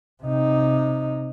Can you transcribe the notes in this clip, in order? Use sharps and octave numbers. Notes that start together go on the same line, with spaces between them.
C3 D#4